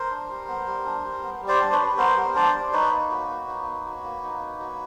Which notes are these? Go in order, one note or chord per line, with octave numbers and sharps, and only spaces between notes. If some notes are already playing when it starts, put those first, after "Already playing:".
Already playing: A#4 C5
D4
G3
B3
G3
D4
G3
B3
G3
C5 D5
D4
B4 C#5
G3
B3 A#4 C5
G3
D4 C5 D5
G3
D#4 B4 C#5
A#3
F#4
A#3
D#4
A#3
F#4
A#3
D#4
A#3
F#4